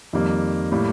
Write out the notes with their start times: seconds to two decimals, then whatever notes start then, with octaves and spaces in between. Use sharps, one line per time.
0.13 F2 D#3 G3 A#3
0.72 A2 G3 A#3